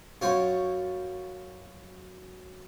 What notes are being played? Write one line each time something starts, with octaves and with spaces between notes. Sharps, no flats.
F#2 F4 C#5